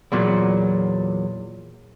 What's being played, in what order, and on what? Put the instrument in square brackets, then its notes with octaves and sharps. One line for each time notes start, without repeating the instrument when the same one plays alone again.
[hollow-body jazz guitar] E2 A#2 F#3